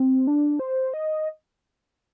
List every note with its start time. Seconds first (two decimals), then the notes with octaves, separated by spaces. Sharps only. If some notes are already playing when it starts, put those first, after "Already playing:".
Already playing: C4
0.27 D4
0.59 C5
0.94 D#5